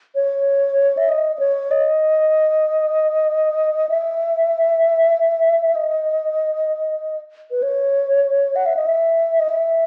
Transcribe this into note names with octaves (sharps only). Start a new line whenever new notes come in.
C#5
E5
D#5
D#5
C#5
D#5
E5
D#5
B4
C#5
F#5
E5
D#5
E5
D#5
E5